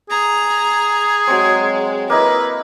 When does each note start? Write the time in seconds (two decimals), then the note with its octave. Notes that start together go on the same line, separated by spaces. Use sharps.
0.10 G#4 A#5
1.27 F#3 G#3 C4
2.10 A#3 D#4 E4 B4